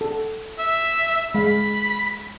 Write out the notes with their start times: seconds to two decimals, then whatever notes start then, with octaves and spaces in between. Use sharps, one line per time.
0.01 A4
0.59 E5
1.34 G#3 F5 B5